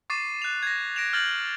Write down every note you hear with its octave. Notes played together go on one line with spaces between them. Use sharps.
C#6 D6 A6 C7 D#7
F#6 F7
G#6 A#6
A#6 D7 E7 F7
F6 G6 A6 F#7